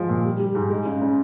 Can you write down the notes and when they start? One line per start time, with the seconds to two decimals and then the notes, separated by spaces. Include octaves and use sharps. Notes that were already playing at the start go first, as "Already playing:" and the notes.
Already playing: F3 G#3
0.09 A#2
0.24 G3
0.40 G3
0.55 G#2
0.70 G#3
0.86 C#3
1.02 C#3